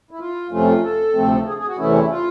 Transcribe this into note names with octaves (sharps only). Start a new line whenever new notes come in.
E4
F4
F2 C3 F3 A3 C#4 F4
A4
D2 C3 F3 A3 C4
G#4
G#4
F#4
E2 C3 E3 A3 C#4 E4
F4